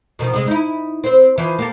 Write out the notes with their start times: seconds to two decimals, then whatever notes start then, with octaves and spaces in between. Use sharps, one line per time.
0.19 B2 D#3 F3
0.33 C3 G#3
0.47 D#4 E4
1.04 C4 C5
1.38 E3 F3
1.59 A#3 G4 A4